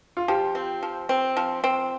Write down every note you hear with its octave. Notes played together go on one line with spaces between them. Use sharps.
F4
F3 G4
C4
F3
C4
F3
C4